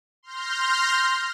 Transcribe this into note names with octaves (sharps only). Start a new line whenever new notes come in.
C6 F6 G6 A#6